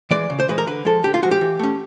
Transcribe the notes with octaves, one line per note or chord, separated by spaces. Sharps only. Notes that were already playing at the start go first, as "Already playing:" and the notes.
E3 G#3 D5
C#3
C5
E3 G#3 B4
A#4
D3 B4
F3 G#3 A4
D3 G4
F4
F3 G#3 F#4
G4
E3
A3 C#4